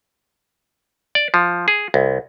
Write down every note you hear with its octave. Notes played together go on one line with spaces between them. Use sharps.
D5
F3
G#4
C2